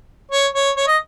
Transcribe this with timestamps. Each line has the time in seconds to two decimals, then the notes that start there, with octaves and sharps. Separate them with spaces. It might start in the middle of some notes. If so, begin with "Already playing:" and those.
0.31 C#5
0.55 C#5
0.77 C#5
0.87 D#5